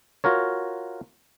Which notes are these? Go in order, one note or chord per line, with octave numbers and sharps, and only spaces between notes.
F4 F#4 A#4 C#5